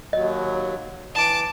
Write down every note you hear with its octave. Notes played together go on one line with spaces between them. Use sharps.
D#2 F#3 D#5
E3 A5 D6